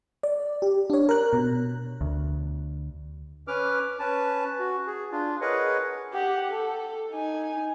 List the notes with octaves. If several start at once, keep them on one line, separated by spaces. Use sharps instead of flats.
D5
G4
D4 C#5
A#4 F#6
B2
D2
C#4 B4 D6 F6
C#4 B4 A5
F#4
G#4
D4 F4
G#4 A#4 B4 C#5 D#5 F#5
G4 F#5
A4
D#4 G#5